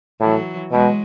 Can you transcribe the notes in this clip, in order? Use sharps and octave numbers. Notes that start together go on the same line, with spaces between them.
A2 E3 F#3
B2 F#3 G#3